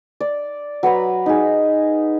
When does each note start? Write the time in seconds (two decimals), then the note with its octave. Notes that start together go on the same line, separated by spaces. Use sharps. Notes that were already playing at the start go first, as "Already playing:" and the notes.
0.20 D5
0.83 F#3 B4 A#5 B5
1.26 D#4 G#4